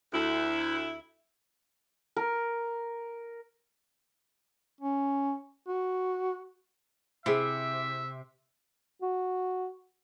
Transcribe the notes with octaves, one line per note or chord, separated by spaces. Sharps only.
D2 E4
A#4
C#4
F#4
C3 E4 G#4 E5
F#4